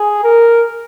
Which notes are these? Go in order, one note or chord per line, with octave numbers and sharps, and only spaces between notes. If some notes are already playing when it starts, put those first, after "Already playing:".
Already playing: G#4
A#4